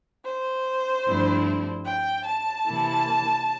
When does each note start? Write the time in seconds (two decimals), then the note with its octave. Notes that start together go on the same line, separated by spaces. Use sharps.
0.25 C5
1.05 G2 F3 A3 C4 E4
1.85 G5
2.25 A5
2.66 C3 E3 A#3 E4